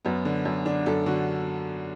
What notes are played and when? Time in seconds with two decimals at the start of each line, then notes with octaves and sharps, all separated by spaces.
0.05 F#2 B3
0.25 D3
0.45 F#2
0.66 D3 D4
0.86 F#2 A4
1.06 D3 F#4